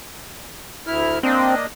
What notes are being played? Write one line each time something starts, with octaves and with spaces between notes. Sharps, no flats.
D2 E4 F6
A#3 C4 D4 D#5